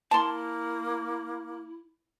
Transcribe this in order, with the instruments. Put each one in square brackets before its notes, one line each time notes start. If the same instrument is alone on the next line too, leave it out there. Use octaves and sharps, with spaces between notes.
[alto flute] A#3 [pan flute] E4 [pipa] A5 C6